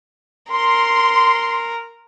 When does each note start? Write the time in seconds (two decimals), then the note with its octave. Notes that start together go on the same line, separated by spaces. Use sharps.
0.51 A#4 C6